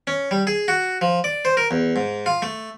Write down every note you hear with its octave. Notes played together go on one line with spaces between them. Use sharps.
C#4
G3
G#4
F#4
F3
D5
C5
A#4
E2
G#2
F4
A3